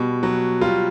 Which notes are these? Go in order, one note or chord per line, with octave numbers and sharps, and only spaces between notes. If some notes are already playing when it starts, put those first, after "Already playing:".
Already playing: B2 G3
F#3
G3 F4